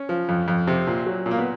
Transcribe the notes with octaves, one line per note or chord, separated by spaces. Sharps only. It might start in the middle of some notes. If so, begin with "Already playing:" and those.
Already playing: C#4
F3
F2
F2
C3
A#2
F#3
A#2
A#3
B3